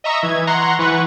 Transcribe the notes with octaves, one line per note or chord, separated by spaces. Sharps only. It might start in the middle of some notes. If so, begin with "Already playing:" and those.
D#5 E5 A#5 C#6 E6
E3 G#6
F#5 A#5 C6 C#6
E3 B4 F#5 C#6